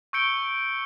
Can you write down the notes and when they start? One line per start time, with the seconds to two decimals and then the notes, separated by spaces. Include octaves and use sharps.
0.13 C#6 E6 G6 C#7 D7 G7